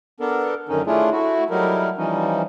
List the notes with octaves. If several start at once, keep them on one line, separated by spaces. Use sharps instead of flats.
B3 D4 A4 A#4
F#2 D3 D#3 C#4 D#4
A3 C#4 D4 E4 F4 G#4
A3 E4 F#4
F#3 G3 A3 D#4 E4 A#4
E3 F3 G3 C#4 D#4